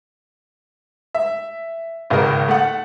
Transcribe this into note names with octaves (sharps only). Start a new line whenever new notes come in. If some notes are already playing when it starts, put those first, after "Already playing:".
E5
G#1 C#2 A#4
A3 F#5